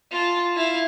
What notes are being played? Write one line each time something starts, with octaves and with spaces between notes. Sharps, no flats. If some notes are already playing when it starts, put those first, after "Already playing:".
F4 A5
E4 F5